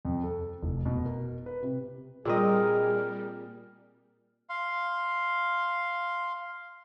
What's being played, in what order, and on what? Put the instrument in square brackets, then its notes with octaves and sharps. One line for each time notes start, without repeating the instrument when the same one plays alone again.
[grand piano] F2
A4
F1
B2
A#4
B4
C3
[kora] A#2 C4 D#5 [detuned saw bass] G3 [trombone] G#4 [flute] A#4
[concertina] F5 C6